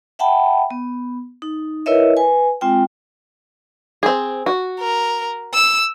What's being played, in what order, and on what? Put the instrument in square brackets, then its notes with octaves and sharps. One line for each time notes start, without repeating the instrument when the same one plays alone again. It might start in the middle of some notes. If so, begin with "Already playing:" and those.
[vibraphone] E5 F#5 G5 A5 B5
B3
D#4
E4 A#4 B4 C#5 D#5 E5
B4 G#5
G#3 C4 F4 G5
[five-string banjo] C4 G#4
F#4
[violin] A#4
E6